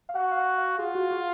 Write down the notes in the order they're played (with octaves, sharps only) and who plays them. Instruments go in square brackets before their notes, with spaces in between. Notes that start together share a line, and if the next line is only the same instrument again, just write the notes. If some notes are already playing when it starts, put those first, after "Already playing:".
[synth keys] F5
[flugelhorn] F#4 [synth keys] F#5
[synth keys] F5
F#5
F5
[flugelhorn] F4 [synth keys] G#4
[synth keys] F#4
F#4